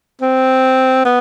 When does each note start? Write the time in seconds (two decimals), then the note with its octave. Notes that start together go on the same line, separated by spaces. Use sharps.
0.22 C4
1.05 B3